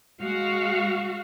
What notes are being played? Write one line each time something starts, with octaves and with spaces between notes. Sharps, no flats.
G#3 F#4 F5